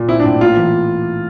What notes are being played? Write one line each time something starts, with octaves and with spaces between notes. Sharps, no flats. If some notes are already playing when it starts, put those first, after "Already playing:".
Already playing: A#2
C4 E4
D4
A2
A#3 F4
E3